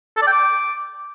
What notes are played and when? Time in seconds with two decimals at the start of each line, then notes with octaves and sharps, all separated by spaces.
0.17 A4
0.22 D5
0.27 G5
0.32 D6